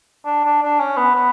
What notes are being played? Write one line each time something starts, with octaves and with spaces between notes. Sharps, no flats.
D4
D4
D4
C#4
B3
B3